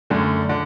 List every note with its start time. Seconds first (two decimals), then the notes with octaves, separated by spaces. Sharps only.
0.10 F#2 D3 A3
0.49 D3